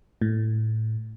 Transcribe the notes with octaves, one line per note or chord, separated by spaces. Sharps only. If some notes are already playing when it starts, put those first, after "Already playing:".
A2